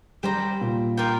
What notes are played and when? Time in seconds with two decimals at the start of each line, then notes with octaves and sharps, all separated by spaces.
0.23 G3 G4 C5 G5 A#5
0.61 A#2
0.97 F4 A#4 D5 G5